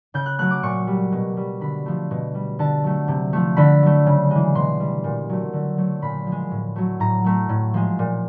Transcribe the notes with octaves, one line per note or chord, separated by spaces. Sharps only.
C#3 G6
F#6
F#3 A3 F#6
D6
A#2 C#6
G3
B2
G3
D3 B5
F3 A3
B2
G3
D3 A5
F#3 A3
C3
F3 A3
D3 B5
F#3 A3
C#3
E3 G#3
B2 C6
G3
A#2
F#3 A3
D3
F#3 A3
A#2 B5
F3
G#3
A2
F#3 A3
A2 A#5
F#3 A3
A2
F3 G#3
A#2